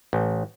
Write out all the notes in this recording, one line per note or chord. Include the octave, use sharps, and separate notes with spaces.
A1